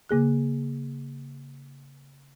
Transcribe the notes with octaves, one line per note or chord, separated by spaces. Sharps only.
C#3 A#3 G#4 F#6